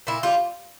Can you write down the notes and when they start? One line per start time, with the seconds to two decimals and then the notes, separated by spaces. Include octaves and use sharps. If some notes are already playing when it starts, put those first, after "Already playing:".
0.07 A#2 E4
0.23 G3 F4